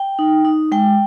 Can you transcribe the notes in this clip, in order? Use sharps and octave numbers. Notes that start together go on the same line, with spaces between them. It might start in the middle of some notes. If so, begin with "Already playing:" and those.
Already playing: G5
D#4
D#4
G#3 G5